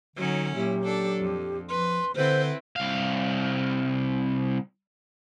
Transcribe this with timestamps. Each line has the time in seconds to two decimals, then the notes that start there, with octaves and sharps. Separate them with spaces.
0.16 D3 F#3 C#4 D#4
0.55 A#2 F#3 E4 G4
0.85 D4 A4
1.18 F2
1.69 F3 B4 C6
2.16 D3 C4 E4 B4 C5
2.76 C2 F5